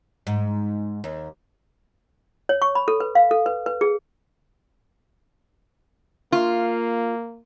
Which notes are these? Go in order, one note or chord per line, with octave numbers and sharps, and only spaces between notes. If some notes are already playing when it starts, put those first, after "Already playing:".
G#2
D#2
C#5
C#6
B5
A4
B4
F5
A4
B4
B4
G#4
A#3 F4